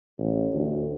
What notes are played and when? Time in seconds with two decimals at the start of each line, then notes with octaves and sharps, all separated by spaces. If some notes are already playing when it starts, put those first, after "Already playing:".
0.19 A1
0.53 D2